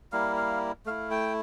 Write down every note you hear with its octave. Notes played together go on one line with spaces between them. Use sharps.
G3 A#3 E4 F5
F5
A3 E4 F5
G5